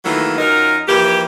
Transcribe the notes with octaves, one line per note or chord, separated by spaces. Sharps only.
D#3 E3 F#3 A3 A#3 F4
F#2 F#3 D#4 F4 A#4
E3 F3 A#3 G4